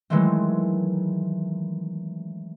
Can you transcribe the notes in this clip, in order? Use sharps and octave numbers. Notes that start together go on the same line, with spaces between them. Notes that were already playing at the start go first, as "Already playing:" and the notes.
D#3 E3 F#3 G#3 A3 C4